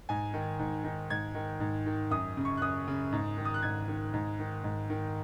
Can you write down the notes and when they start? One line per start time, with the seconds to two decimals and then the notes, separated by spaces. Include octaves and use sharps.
0.09 G#2 G#5
0.34 D#3
0.59 G#2
0.84 D#3
1.10 G#2 G#6
1.35 D#3
1.60 G#2
1.86 D#3
2.11 F#2 D#6
2.37 C#3
2.45 C#6
2.57 F#6
2.62 F#2 D#6
2.88 C#3
3.12 G#2
3.37 D#3
3.45 D#6
3.54 F#6
3.63 G#2 G#6
3.88 D#3
4.14 G#2
4.40 D#3
4.64 G#2
4.90 D#3